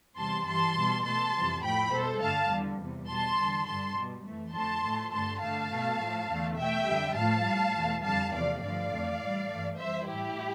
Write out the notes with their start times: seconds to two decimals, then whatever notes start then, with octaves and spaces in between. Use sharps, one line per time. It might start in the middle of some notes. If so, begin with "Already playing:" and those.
0.17 E2 C3 G3 A5 C6
0.46 G2 E3 G3 A5 C6
0.75 B2 G3
1.04 B2 A3 A5 C6
1.33 F2 C3 E3 G3
1.62 A2 F3 A3 G5 B5
1.92 B2 G3 A4 C5
2.21 G2 D3 A3 F5 A5
2.50 E2 D3 G3
2.79 E2 C3 G3
3.08 B2 G3 A5 C6
3.38 E2 D3 G3
3.66 G2 D3 G3 A5 C6
3.96 B2 G3
4.25 F2 E3 A3
4.54 F2 D3 F3 A3 A5 C6
4.83 A2 F3 A3
5.12 G2 D3 A3 A5 C6
5.41 G2 D3 A3 F5 A5
5.71 B2 A3
5.99 A2 F3 A3
6.29 E2 D3 A3
6.58 B2 A3 E5 G5
6.87 F2 D3 G3
7.16 A2 F3 A3 F5 A5
7.46 A2 G3
7.75 E2 B2 A3
8.04 F2 D3 G3 F5 A5
8.33 E2 C3 F3 A3 D5 F5
8.63 G2 D3 F3 A3 D5 F5
8.92 F2 E3 A3
9.21 A2 G3
9.50 G2 E3 A3
9.79 F2 E3 G3 C5 E5
10.08 A2 G3 E4 G4